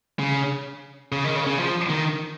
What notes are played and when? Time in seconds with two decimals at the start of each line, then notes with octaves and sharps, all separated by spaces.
0.19 C#3
1.12 C#3
1.24 D#3
1.36 C#3
1.47 C#3
1.59 F3
1.89 D#3